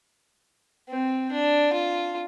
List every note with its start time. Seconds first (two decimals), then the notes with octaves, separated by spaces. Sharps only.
0.89 C4
1.32 D4
1.73 F4